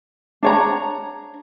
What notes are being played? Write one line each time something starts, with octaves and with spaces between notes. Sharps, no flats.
D4 C#5 A#5